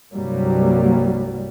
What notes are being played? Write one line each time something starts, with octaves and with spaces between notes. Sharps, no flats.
C2 G2 F#3 G3 A#3